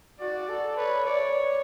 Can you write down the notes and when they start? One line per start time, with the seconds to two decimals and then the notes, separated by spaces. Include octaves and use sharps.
0.20 F#4 D5
0.49 A4
0.77 B4 C#5
1.06 D5